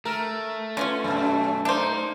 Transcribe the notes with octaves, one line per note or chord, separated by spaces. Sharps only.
A3 A#4
D3 B3 C#4 F4
F#2 B2
A#3 D4 D#4 C5